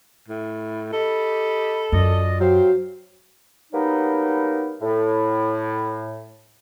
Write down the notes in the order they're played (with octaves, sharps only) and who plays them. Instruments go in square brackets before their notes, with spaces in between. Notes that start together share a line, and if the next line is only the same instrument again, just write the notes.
[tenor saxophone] A2
[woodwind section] G4 D#5 B5 [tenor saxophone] A4
[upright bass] F#2 [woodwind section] F4 D5 D#5
[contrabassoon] F#3 [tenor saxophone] G4 [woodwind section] C5 F5
[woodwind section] F#3 G3 A#3 B3 D#4
A2